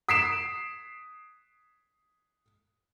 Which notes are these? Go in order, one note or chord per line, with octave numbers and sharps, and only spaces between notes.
D#6 B6 C7 D7 E7